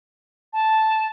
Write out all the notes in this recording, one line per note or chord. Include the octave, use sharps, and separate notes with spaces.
A5